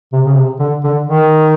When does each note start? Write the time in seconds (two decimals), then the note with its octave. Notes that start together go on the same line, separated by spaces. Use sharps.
0.12 C3
0.26 C#3
0.36 C3
0.60 D3
0.84 D3
1.07 D#3